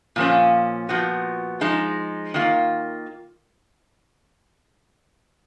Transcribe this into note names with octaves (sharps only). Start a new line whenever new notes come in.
A#2 F3 A#3 C#4
A#2 F3 B3 F#4
F3 G#3 D#4
D#3 A#3 F4